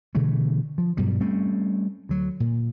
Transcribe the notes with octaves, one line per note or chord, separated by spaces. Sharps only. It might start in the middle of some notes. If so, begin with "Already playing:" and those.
B2 D3 E3 A3
F3
G2 B2 F#3 G3
G3 A3 C4 C#4
D2 F#3
A#2